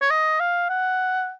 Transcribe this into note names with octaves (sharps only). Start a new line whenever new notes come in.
C#5
D#5
F5
F#5